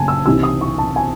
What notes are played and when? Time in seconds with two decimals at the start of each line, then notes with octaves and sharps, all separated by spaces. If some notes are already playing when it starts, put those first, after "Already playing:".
Already playing: F#1 C#3 G#5 A5
0.08 E6
0.26 C2 C3 E3 C4 D#4 E6
0.43 D#6
0.61 C#6
0.78 A5
0.96 G#5